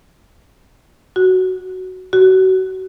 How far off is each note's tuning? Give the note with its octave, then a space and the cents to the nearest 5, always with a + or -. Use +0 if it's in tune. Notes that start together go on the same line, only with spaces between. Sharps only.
F#4 +5
F#4 +30